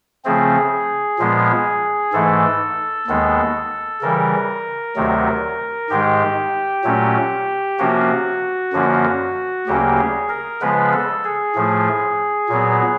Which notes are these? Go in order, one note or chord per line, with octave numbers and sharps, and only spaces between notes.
C#3 F3 A3 C4 G#4
A#2 F3 G#3 B3
G#2 E3 A3 A4
D#2 D#3 G#3 B3
C#3 E3 G3 A#4
D2 C3 D#3 F#3 A3
G#2 D#3 G#3 G4
A#2 F#3 A3 C#4
C3 F3 A#3 C#4 F#4
F#2 D3 F3 A#3 C#4
D2 C#3 F#3 A#3 C#4 G4
G#4
A#4
C#3 F3 G#3 B3 B4
A4
G#4
A2 F3 A3
A#2 F#3 B3